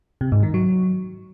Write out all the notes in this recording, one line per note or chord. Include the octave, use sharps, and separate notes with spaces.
C3
G#2
D#3
F#3